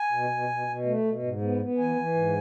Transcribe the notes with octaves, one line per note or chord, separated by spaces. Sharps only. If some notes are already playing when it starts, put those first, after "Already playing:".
Already playing: G#5
B2
B2
B2
B2
A3
B2
G#2
B3
B3
E3 G#5
E3
G#2